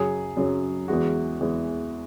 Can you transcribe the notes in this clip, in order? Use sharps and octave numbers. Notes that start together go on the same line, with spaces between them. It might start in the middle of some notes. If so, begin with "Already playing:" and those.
Already playing: F#2 C#3 F#3 G#4
F#2 C#3 F#3
E2 E3 G#3 F#4
E2 E3 G#3